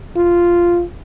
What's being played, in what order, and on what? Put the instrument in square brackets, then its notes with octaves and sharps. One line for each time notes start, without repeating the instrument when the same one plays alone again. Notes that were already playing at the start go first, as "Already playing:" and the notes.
[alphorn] F4